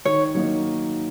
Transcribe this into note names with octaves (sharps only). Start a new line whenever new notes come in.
D#3 C#5
F#3 A#3 D#4